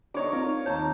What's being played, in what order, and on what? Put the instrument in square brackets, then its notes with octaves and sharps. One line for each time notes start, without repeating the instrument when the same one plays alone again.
[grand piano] D4 [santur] D#4 C#5 D6
[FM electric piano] C4 D#4 [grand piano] F4 [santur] A#4
[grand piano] D#2 A5 [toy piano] C#5 A#5